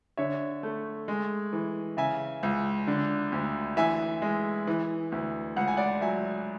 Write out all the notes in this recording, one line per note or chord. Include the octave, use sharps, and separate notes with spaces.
D3 C#5 E5
A3
G#3
E3
C#3 E5 G#5
C#2
D3
D2
E3 E5 G#5
G#3
E3
D2
C#2 F#5
G#5
D5 F#5
F#3 E5 G#5